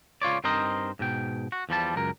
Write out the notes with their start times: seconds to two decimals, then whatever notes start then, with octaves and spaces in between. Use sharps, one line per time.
0.22 C#2 F4 C#5 D5
0.44 G2 C4 D#4 A#4 C5 D#5
0.99 G#2 B2 G5
1.52 F#4
1.69 E2 F3 G3 A5
1.96 C#2 F#2 A#4